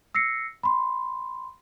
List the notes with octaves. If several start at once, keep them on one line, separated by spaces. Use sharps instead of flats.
E6 A#6 C7 C#7
B5 C6